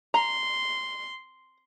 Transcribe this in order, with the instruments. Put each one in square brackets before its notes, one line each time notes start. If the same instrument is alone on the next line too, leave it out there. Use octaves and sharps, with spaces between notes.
[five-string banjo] A#5 [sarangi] C6